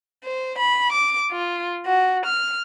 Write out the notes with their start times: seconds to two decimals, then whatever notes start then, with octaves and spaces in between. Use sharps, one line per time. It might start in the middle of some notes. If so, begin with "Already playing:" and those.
0.24 C5
0.58 B5
0.92 D6
1.31 F4
1.86 F#4
2.26 F6